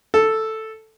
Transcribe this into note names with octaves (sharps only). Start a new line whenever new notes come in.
A4